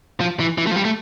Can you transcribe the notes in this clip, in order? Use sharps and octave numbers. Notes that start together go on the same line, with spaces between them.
F3
E3
E3
A3
F3
G3
A3